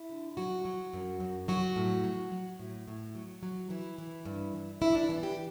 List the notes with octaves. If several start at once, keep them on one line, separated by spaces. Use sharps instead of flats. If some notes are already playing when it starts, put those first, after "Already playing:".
Already playing: E4
D3
F#3 F#4
F#3
F#2
F#2
F#3 F#4
A2
F#3
F#3
A2
A2
F#3
F#3
E3 E4
E3
G2
E3
G2 E4
D4
E3 B3
G4